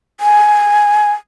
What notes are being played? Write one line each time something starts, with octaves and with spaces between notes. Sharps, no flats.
G#5